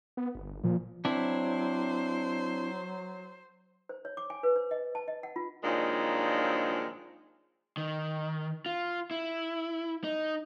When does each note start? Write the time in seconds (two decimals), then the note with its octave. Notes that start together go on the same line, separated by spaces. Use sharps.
0.17 B3
0.35 G1
0.64 A#2 F3
1.05 F#3 C4 D4 E4 C5
3.89 C5
4.05 C#5
4.17 D6
4.30 G#5
4.43 B4
4.56 C5
4.71 D#5
4.95 A5
5.08 D#5
5.23 F#5
5.36 F4
5.64 A#2 D#3 F3 F#3 G#3 D4
7.77 D#3
8.66 F4
9.11 E4
10.04 D#4